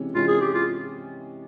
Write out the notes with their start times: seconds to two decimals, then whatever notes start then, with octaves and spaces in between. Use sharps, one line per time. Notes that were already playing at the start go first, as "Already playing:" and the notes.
Already playing: C3 E3 G#3 C#4
0.15 C3 E3 G#3 C#4 F4
0.28 G#4
0.41 G4
0.54 F4